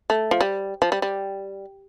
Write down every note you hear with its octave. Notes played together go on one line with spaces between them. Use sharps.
A3
F3
G3
F3
G3
G3